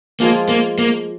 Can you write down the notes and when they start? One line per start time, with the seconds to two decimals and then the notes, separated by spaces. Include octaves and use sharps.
0.20 F3 G#3 A#3 F4 G#4
0.49 A#3
0.78 A#3